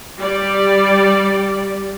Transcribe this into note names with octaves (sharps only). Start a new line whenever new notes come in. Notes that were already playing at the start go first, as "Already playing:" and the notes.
G3 G4 D5